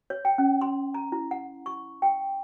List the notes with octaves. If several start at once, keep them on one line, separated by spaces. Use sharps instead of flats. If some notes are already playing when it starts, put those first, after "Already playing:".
C#5
G5
C#4
C6
A#5
E4
F#5
C#6
G5